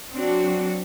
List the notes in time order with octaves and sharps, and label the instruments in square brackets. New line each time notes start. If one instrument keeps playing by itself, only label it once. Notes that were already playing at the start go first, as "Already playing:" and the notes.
[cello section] F#3 C4 D4 F#4